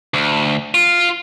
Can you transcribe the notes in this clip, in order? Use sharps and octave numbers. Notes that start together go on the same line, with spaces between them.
D2
F4